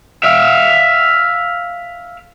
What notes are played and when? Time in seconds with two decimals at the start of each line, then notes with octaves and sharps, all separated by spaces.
0.23 E5 F5